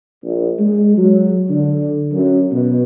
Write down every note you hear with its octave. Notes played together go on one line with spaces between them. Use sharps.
A#1
G#3
F#3
D3
F#2
B2